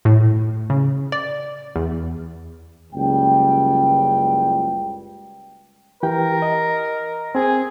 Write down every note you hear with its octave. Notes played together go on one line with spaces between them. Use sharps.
A2
C#3
D5
E2
F#1 C#2 G3 G5
E3 G4 A#4 G5
D#5
C4 G#4